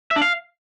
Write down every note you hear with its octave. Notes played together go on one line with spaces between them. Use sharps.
E5
D4
F5